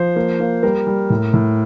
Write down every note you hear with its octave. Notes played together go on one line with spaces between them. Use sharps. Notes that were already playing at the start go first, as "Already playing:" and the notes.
Already playing: F3 C5
A#3
A#3
G3 A#4
G3
A2
A2